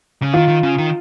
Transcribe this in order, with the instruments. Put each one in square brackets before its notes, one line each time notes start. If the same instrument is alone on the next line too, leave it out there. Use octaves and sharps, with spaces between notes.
[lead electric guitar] C#3
[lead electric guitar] D#3 [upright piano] F4
[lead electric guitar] D#3
C#3
D#3